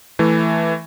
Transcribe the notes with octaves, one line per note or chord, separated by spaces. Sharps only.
E3 A3